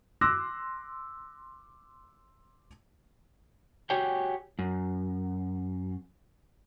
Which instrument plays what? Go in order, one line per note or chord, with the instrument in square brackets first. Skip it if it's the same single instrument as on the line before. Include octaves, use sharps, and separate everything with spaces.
[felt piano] C6 D6 E6 F#6 A#6
[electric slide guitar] F#4 G4 C#5 G5 G#5
F#2